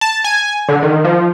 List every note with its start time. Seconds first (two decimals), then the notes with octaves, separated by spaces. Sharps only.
0.01 A5
0.24 G#5
0.68 D3
0.83 D#3
1.04 F3